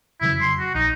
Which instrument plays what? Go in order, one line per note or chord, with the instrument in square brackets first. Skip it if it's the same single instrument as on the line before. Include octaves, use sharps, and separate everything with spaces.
[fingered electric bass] F1 C#3 F#3 [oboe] E4
[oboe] C6
F#4
[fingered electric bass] A#1 [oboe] D#4